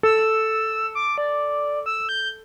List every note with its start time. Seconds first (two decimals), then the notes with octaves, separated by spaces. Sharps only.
0.03 A4 E6
0.95 D6
1.18 D5
1.86 E6
2.09 G6